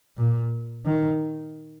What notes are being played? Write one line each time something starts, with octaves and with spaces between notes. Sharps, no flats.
A#2
D#3